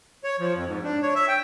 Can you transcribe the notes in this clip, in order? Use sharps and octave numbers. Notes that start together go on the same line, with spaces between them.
C#5
F3
F2
G#2
D4
C#5
E5
G5